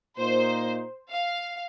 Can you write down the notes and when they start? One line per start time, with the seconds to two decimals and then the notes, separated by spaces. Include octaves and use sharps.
0.18 A#2 A#3 D#4 C5
1.10 F5